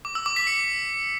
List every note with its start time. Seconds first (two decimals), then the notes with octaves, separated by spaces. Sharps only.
0.05 D6
0.15 E6
0.26 D6
0.36 B6
0.47 C#7